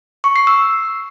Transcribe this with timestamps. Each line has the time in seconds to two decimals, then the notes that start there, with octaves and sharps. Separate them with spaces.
0.24 C#6
0.36 C7
0.47 E6